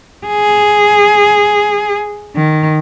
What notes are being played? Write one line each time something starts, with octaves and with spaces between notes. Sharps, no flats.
G#4
D#3